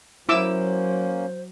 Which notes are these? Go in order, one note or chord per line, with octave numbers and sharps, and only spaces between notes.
F#3 A#3 C#4 E4 C5 D6 E6